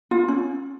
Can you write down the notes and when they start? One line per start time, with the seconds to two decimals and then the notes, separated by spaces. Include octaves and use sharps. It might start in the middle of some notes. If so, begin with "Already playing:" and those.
0.11 F4
0.28 C#4